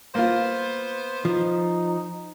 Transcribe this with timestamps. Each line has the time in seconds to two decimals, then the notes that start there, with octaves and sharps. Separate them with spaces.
0.15 A#3 B3 F4 C5
1.25 F3 D#4